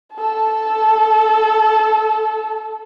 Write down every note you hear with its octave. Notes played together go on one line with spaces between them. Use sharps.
A4 A5